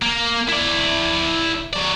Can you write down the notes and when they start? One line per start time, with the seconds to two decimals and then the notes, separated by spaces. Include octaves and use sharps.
0.02 A#3
0.49 E4 D5
1.73 F#3 D5